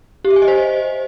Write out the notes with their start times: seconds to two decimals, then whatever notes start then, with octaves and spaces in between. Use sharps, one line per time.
0.25 G4
0.30 E5
0.36 G#5
0.42 D#5
0.48 C5